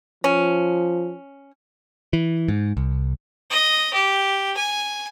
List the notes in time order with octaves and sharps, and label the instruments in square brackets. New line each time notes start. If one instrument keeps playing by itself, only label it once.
[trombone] F3 [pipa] C#4
[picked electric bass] E3
G#2
C2
[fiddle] D#5
G4
G#5